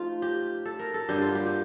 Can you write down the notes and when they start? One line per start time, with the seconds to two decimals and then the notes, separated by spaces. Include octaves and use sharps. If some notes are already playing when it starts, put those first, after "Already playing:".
Already playing: F3 A3 D#4 F4
0.22 G4
0.65 A4
0.79 A#4
0.94 A4
1.09 G2 D3 G3 A#3 G4
1.22 F4
1.35 G4
1.46 G4